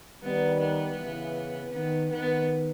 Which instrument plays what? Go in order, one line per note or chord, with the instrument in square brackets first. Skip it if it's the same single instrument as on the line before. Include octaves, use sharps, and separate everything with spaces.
[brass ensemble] D#3 G3 [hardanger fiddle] B3
[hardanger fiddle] B3
[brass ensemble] C#3 E3
[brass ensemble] D#3 [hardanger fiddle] B3
[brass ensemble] D#3 [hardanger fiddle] B3